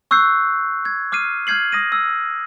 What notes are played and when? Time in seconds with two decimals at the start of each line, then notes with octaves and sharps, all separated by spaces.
0.11 C#6 E6 F#6 G6 C7
0.85 G#6
1.12 D6 F6 C7 D#7
1.47 F6 G6 G#6 C7 F#7
1.72 D#6 A#6 D#7
1.92 E6